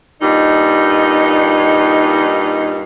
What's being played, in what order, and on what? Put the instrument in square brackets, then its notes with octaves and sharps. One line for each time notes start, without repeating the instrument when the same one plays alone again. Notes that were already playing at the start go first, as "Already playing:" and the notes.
[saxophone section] G2 A#2 D#4